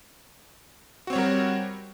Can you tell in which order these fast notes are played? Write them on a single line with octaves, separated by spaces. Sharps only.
F#4 C4 C#5 G3 A#4